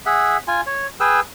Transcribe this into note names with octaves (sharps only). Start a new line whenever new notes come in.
G#4 E5 F#5
F4 G#5
C#5
G#4 B4 G5 E6